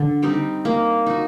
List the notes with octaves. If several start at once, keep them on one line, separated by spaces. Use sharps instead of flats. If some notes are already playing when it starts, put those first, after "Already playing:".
Already playing: D3
G3 C4 D#4
A#3
D#4 F#4